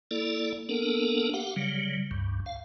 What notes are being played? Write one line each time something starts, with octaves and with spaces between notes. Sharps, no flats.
A#3 E4 A4 D5
A#3 B3 D4 A4 A#4
G4 F5 F#5
C#3 F#3 G3
C#2 G2
F5